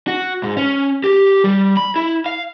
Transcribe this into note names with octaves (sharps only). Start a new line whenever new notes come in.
F#4
G#2
C#4
G4
G3
B5
E4
F5